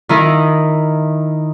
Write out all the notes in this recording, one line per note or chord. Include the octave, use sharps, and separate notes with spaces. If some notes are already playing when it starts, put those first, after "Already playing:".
D#3 D#4 E4 A#4